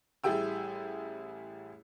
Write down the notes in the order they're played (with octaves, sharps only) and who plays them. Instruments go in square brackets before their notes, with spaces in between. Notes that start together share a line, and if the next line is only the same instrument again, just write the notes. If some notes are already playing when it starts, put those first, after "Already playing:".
[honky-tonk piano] A1 G3 E4 G#4 G5 E6